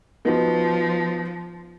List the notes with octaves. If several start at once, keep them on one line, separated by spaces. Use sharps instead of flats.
F3 B3 D#4 F#4